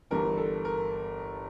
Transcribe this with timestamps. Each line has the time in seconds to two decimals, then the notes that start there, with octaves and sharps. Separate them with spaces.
0.11 G1 G2 E3 A#4
0.37 A4
0.65 A#4